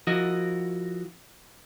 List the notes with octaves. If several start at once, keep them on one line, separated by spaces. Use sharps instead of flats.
F3 E4 F#4 A#4 D#5